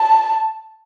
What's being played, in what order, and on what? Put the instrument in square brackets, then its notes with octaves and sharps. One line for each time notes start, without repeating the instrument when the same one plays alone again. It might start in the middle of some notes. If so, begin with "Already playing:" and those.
Already playing: [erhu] A5